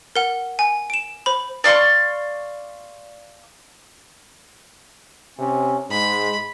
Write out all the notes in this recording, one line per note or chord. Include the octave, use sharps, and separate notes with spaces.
A#4 F#5
G#5
D7 E7
C5 B5
D5 F5 C6 C#6
C3 C#4
G#2 G#3 B5